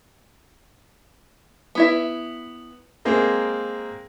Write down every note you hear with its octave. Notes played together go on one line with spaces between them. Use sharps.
B3 E4 E5
G#3 A#3 C4 G#4 A#4